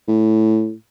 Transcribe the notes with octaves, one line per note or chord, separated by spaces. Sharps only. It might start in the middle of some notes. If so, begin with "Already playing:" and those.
A2